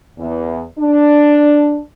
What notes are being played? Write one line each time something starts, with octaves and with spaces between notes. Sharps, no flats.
E2
D4